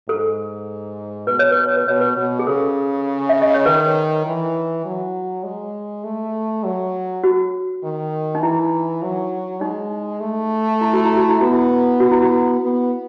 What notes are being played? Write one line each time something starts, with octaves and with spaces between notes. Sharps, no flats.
G#2 A4
B2 B4
C#5
B4
C#5
B4
B2 C#5
B4
B2
G#4
C#3 A4
E5
D#5
C#5
D#3 B4
E3
F#3
G#3
A3
F#3
F#4
D#3
D#4
E3 E4
F#3
G#3 D#4
A3
E4
F#4
E4
F#4
E4
B3 F#4
E4
F#4
E4
F#4
B3